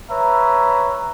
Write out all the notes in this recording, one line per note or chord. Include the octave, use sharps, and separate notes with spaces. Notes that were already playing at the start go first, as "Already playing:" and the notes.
B4 C#5 E5 A#5